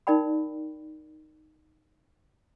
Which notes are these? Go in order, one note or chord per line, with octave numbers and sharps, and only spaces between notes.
D#4 A#4 D5 G5 B5